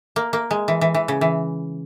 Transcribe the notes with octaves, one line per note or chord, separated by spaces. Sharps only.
A#3
A#3
G#3
E3
E3
E3
C#3
E3